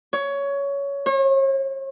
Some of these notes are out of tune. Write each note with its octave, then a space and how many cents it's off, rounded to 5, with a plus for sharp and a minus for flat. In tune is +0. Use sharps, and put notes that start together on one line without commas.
C#5 +15
C#5 -40